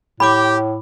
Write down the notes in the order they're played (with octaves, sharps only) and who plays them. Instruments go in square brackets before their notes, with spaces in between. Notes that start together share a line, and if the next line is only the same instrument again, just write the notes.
[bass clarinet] A2 [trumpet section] G4 G5 [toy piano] B5 D6